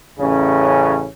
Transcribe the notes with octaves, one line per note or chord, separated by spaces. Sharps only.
A1 C#3 C#4